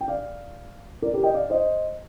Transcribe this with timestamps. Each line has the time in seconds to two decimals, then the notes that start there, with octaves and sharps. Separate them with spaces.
0.01 G5
0.08 D5 F5
1.02 A#4 D5
1.14 G4 A#4
1.23 D#5 G5
1.34 D5 F5
1.50 C5 D#5